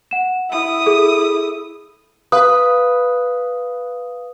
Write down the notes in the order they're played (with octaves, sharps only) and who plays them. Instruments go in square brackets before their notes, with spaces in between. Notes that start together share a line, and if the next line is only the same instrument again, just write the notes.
[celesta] F#5 E7
[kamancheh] E4 D#6
[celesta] G#4 A4
[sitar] B4 [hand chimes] F5 D#6